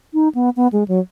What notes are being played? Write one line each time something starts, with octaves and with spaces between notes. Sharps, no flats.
D#4
B3
B3
G#3
F#3